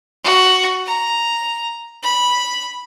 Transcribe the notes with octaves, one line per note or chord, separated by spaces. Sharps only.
F#4
A#5
B5